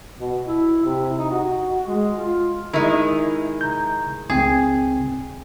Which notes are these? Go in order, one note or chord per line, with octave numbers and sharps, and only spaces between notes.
B2
E4
C3
D#4
F#4
G#3
F4
D#3 G#3 E4
A#5 G6
C#2 C4 G#4 G5